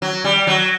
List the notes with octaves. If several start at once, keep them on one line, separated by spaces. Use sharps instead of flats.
F#3
G3
F#3